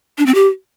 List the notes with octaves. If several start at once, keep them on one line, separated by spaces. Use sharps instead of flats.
D4
C4
G4